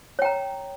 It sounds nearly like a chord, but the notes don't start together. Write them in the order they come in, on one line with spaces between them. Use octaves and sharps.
C#5 G5 A#5